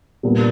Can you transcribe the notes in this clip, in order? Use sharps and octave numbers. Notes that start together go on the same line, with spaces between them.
A#2 G3 B3 D4